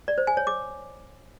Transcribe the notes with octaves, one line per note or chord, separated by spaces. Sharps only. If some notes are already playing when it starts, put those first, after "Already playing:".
D5
C5
G#5
C#5
D6